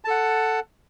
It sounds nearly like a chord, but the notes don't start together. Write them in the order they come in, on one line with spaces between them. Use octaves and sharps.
A5 A4 F#5